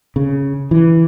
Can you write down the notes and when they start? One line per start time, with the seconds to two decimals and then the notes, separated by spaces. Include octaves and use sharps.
0.16 C#3
0.71 E3